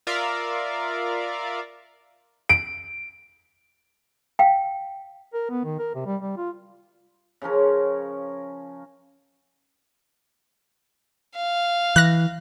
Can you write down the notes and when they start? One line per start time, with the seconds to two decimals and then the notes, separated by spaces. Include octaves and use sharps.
0.07 F4 A#4 D5 E5 F5
2.49 D7
4.39 F5 G5
5.34 A#4
5.50 B3
5.65 D#3
5.79 A#4
5.95 C3
6.06 G3
6.22 G3
6.37 F4
7.42 C#3 F3 C#4 A#4
11.36 F5
11.96 E3 F#6 A#6